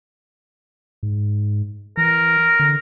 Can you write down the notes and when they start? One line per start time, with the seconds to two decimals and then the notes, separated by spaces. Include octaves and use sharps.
1.03 G#2
1.97 E3 A#4
2.59 D3